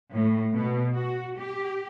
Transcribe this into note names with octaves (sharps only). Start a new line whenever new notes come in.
A2
B2
F#4
G4